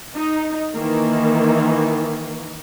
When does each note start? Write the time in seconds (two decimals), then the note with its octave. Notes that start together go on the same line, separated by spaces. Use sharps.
0.17 D#4
0.76 D#3 E3 A#3